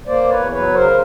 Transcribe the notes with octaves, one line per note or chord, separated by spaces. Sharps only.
A#3 C5 D5
E2 B4 C#5
F#3 B4 C#5
C#3 A#4 C5